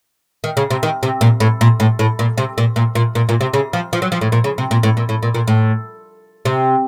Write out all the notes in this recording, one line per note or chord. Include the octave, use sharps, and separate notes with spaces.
D#3
C#3
C3
D#3
C3
A#2
A2
A#2
A2
A2
A#2
C3
A#2
A#2
A#2
A#2
A#2
C3
C#3
F3
F3
F#3
F3
A2
A#2
C#3
C3
A#2
A2
A#2
A2
A#2
A#2
A2
C3